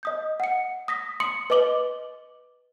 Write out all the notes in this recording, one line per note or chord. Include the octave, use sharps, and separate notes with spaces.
D#5 D#6 G6
F#5 C#7
D#6 A#6 B6
C6 D#6 C#7 F#7
B4 D#5 D6 F#7 G7